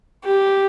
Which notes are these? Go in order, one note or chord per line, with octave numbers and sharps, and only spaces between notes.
G4